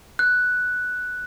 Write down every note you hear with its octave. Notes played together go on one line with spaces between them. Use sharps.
F#6